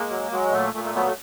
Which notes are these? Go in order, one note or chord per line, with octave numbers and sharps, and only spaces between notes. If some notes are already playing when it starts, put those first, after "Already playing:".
Already playing: G#3 A#3
F#3
F#3 G#3
A#2 A3
A#2 A3
A3
F#3 A3 B3
A3